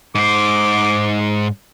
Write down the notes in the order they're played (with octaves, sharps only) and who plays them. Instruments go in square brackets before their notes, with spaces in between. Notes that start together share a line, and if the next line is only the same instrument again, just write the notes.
[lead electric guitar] G#2 C5 [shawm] D6